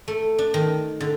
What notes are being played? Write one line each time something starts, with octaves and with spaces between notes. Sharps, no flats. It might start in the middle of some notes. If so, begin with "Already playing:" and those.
A3
D4
D#3
D3